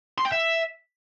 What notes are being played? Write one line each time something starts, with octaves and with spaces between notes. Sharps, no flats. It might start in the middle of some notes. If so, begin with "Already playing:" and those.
C6
G5
E5